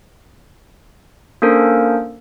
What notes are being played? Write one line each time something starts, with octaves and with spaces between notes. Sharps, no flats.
A#3 C#4 D4 A4 A#4 C5